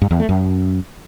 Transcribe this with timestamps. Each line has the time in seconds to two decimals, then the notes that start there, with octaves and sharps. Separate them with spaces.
0.02 G2
0.11 E2
0.20 A3
0.29 F#2